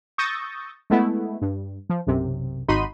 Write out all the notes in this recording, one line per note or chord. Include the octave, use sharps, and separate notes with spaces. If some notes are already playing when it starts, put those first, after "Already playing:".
C#6 D#6 E6 G6 A6 A#6
G#3 A3 B3 E4
G2
F3
B1 F#2 C3
G#1 D#4 F#4 B5 C6 D#7